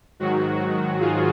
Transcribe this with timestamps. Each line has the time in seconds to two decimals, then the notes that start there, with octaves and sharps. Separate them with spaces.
0.19 G#2 D#3 F#3 F#4
1.00 F4 G#4